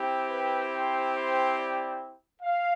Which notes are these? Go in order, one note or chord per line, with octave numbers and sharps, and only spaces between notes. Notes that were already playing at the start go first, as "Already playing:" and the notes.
Already playing: C4 E4 G4
B4
C5
C5
D5
F5